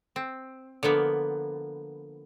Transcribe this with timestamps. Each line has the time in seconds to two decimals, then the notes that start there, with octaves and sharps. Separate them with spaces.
0.16 C4
0.83 D3 F3 A#3 B3